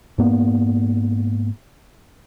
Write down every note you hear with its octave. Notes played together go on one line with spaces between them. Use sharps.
G#2 A#3 B3